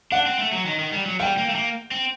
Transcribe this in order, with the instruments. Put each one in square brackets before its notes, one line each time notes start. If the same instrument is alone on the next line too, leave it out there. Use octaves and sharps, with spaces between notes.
[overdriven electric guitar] D4 [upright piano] F#5
[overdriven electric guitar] C4
A3
F#3
D#3
D#3
G3
F#3
[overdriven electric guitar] G3 [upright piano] G5
[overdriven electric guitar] A#3
A3
A#3
C4